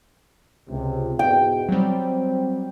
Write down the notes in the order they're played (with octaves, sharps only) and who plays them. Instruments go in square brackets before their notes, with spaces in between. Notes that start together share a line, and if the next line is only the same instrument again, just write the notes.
[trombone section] C#2 C3
[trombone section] E2 G#2 B2 [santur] G5
[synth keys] F#3 G3 [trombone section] C4